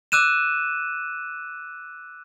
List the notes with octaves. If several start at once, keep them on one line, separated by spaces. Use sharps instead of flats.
D6 E6 F#6 D#7 E7